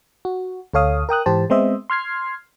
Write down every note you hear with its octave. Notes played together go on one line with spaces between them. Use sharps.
F#4
D2 A4 C#5 F5 D#6
A#4 G5 D#6 F#6
G#2 E3 G4 C5 A5
G#3 B3 C4 C5 D#5 E5
C6 F6 G#6 C7